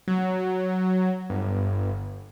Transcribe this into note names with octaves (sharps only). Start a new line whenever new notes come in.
F#3
G1